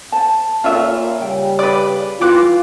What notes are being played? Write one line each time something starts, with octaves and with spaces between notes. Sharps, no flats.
C5 A5
A#2 C#4 F4 A4 B4 E5
C#3 G3 G5
B4 D5
E3 F4 D6 F#6